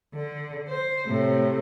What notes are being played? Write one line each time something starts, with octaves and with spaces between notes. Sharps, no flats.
D3
C5
A2 C3